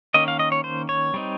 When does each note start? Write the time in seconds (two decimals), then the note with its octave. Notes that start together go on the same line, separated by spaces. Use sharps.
0.14 D#3 A#3 C#4 D#5
0.28 F5
0.39 D#5
0.52 C#5
0.64 C5
0.89 C#5
1.14 G3 C4 D#4